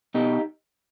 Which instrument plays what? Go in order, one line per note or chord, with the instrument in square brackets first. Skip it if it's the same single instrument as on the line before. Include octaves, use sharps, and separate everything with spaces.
[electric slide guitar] B2 D#4 G4